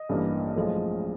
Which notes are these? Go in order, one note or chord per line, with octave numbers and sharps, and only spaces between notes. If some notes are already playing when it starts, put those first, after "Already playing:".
Already playing: D#5
A1 G2 E3 G3 A#3
B1 A2 F3 G#3